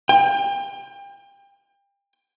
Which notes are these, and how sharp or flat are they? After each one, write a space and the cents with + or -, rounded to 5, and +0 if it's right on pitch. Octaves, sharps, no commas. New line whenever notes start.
G5 +30